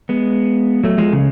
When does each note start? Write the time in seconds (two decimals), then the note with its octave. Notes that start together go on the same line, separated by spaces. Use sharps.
0.09 G#3 B3
0.84 F#3 A3
0.98 F3 G#3
1.13 C#3